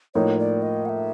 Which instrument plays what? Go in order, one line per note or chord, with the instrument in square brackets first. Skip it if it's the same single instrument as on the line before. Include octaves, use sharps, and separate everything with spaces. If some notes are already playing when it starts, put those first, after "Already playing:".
[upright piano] A2 F3 A#3 D#4 [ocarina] C#5
[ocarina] D5
D#5
F#5
E5